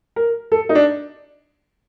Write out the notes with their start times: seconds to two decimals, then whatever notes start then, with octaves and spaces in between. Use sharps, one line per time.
0.16 A#4
0.52 A4
0.69 D#4
0.75 D4